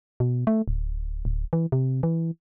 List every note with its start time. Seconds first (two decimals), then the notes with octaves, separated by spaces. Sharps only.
0.20 B2
0.47 A3
0.68 D1
1.25 D1
1.53 E3
1.72 C3
2.03 E3